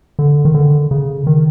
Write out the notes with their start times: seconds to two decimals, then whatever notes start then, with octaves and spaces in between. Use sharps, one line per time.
0.19 D3
0.45 D#3
0.55 D3
0.91 C#3
1.27 D#3